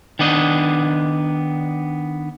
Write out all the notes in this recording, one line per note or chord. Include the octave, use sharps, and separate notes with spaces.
D#3 B3 D4 D#5